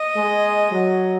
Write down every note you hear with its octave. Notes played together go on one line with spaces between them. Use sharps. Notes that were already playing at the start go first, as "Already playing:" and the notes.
Already playing: D#5
G#3
F#3